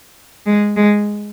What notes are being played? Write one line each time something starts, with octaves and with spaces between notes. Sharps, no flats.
G#3
G#3